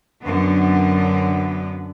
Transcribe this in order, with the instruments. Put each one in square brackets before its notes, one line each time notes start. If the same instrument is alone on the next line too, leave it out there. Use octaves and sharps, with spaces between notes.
[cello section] F#2 D3 B3